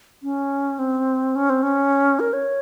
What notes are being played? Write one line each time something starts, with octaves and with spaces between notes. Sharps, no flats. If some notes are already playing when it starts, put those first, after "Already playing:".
C#4
C4
C#4
C4
C#4
A#4
C#5